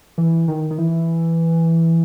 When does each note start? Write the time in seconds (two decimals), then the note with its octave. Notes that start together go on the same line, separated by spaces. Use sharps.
0.18 E3
0.48 D#3
0.71 D#3
0.78 E3